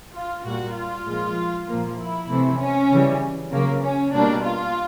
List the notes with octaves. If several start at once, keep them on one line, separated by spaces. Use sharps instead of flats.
F4
A#2 G3 A#3 F#4
F4
A#2 F3 G#3
A#2 F3 A#3
E4
C3 E3 A3
C#4
C#3 E3 G3
C#3 F#3 A#3
C#4
B2 G3 A#3 D4
F4